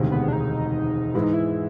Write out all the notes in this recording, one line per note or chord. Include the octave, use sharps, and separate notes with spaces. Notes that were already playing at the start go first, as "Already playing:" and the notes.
Already playing: E1 D2 C3 D#3 G#3
B3
D4
D#4
G#2 E3 G#3 E4
D#4
E4